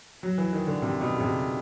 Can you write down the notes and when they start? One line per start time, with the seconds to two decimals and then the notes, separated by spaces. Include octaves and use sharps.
0.23 F#3
0.38 E3
0.53 D#3
0.67 D3
0.82 C3
1.01 B2
1.16 C#3
1.21 C3